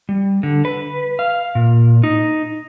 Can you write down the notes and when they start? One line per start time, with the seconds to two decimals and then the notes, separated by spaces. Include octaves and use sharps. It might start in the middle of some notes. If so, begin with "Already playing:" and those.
0.09 G3
0.43 D3
0.65 B4
1.19 F5
1.55 A#2
2.04 D#4